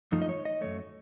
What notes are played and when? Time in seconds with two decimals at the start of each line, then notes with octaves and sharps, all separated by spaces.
0.12 F#2 F3 A3 D#4
0.22 D#5
0.29 C#5
0.45 D#5
0.61 F#2 F3 A3 C#5